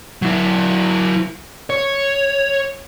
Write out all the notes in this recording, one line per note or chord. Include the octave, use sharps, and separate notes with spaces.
F#3 E4
C#5